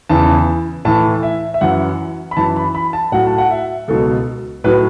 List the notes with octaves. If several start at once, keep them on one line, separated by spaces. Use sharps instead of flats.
E2 C#3 E3 A5
A2 E3 A5
E5
E5
F#2 E3 F#5
B5
F#2 E3 A5
B5
B5
A5
A2 F#3 F#5
A5
F#5
E5
C#2 B2 F#3 A4
A2 F#3 B4